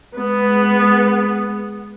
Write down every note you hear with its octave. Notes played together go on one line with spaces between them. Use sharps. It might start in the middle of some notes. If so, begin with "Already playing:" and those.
G#3 B3